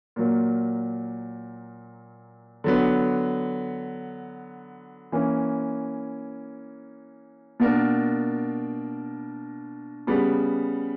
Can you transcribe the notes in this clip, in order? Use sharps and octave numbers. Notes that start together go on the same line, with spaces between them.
A#2 F#3 A#3
D3 F#3 B3
E3 A#3 C#4
B2 A#3 D4 A#4
C#3 G3 B3